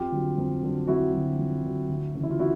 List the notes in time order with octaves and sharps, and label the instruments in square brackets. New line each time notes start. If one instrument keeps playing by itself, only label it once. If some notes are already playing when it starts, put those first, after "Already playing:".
Already playing: [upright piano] F2 F4 G4
D3 F#3
F2
D3 F#3
F2 E4 F#4
D3 F#3
F2
D3 F#3
D2
C#3 E3
E4
F4
E4 F#4